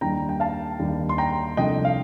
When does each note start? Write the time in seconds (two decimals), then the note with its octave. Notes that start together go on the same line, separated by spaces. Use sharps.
0.01 D#2 D#3 G3 D4 G5 A#5
0.29 G5
0.40 F5 A5
0.79 D#2 D#3 G3 D4
1.09 C6
1.18 G5 A#5
1.57 C2 C3 F3 A3 D4 D#5 G5
1.85 F5